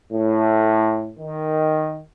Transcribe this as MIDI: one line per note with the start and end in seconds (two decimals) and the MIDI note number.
0.12 1.11 45
1.19 2.00 51